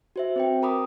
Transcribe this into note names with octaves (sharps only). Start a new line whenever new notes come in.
F#4 C5 E5
C4 B4 G5
A#4 A#5 B5 D6 D#6